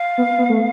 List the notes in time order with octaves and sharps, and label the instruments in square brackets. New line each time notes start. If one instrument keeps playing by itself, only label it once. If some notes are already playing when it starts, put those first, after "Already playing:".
Already playing: [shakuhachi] F5
[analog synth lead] B3
B3
A3